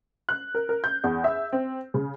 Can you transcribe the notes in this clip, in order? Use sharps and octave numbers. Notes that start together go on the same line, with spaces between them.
F#6
A#4
A#4
G6
E2
E5
C4
C#3